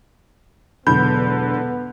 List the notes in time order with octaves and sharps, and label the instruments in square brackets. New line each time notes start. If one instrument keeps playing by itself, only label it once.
[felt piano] E1 E3 F#3 [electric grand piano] D3 G6 [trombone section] B3 [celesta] B5